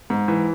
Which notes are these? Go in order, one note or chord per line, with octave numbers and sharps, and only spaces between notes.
G#2
E3